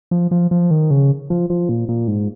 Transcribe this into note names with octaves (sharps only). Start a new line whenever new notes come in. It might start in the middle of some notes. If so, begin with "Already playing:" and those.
F3
F3
F3
D#3
C#3
F3
F3
A#2
A#2
G#2